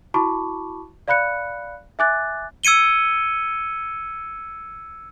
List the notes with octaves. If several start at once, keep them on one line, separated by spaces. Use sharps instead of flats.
E4 F#4 A5 B5 C#6 D6
D5 F5 B5 F#6 C#7
E5 G#5 D6 F#6 A6
E6 G#6 C#7 D#7 G7